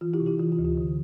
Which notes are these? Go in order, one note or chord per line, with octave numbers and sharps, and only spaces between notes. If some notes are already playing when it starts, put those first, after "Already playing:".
E3 F4
E4 G4
C3
E4 G4
E3 F4
F4
D2
F4
D3